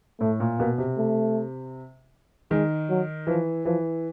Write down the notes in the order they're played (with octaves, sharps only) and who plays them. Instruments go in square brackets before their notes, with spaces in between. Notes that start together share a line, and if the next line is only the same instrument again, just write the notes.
[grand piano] A2 [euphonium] A3
[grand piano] A#2
[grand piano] B2 [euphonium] A#3
[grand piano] C3
[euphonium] A3
[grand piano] D#3 [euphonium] G#3
[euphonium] F#3
[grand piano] E3 [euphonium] F3
[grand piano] E3 [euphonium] F3